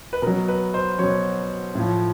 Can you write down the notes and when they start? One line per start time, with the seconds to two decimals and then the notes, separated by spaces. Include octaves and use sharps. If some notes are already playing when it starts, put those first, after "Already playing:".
0.13 B4
0.22 B2 F#3 A#4
0.48 B4
0.74 C5
0.99 B2 F#3 C#5
1.75 A2 F3